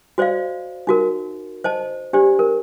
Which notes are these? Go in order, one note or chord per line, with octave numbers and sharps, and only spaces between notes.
F#4 C5 D5 D#5 F5
D#4 F#4 A#4
C5 D#5 A5
D4 G4 C5 D5
A#4